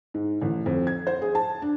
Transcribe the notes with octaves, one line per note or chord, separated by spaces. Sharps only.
G#2
A1
F2
G#6
C5
G#4
A5
D4